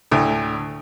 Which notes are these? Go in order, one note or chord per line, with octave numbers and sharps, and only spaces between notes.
D2 A2